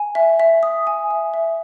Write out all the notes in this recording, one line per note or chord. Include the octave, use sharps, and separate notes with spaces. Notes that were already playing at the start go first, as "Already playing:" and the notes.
Already playing: G#5
E5
E5
D#6
G#5
E5
E5